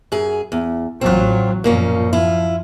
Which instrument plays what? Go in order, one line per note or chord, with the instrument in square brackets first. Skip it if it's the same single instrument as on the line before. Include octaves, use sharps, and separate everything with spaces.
[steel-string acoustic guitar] F#2 G#4
E2
[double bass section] A1 F#3 [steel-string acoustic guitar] C4 F4
[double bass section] F#2 F3 [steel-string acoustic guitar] A#2 A#3 C#4
[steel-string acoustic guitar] E4 F4